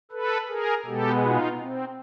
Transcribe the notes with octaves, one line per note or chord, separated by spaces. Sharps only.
A4 B4
G#4 A#4
B2 G#3 B3 G4 A4
D#4 F4
C4